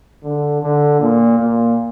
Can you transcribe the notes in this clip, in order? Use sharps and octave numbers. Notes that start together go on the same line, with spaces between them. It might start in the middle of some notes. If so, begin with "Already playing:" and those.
D3
D3
A#2
A#2